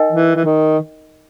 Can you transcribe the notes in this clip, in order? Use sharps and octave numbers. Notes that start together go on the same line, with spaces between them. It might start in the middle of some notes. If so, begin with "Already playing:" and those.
Already playing: D#4 A#4 D#5 G5
E3
E3
D#3